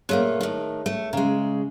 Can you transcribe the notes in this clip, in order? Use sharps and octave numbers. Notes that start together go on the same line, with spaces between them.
A#2 A3 A#3 G#4 C#5 F#6
A2 D#3
A3
C#3 G#3 A#5